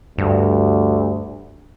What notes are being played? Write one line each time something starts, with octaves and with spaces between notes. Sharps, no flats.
D2 G2